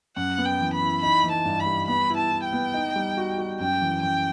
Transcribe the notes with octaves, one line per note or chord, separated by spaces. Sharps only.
F#2 F#5
B3
G5
E3
B5
E4
D#4 B5
E3
A5
G2
B5
G3
B3 B5
E4
A5
E4
G5
B3
D#4
G3
F#4
F#4
F#2 G5
E3
F#2 G5